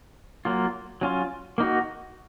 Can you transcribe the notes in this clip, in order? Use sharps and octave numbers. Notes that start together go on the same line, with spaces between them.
F#3 A#3 F4
F#3 C#4 F4
A#3 D#4 F#4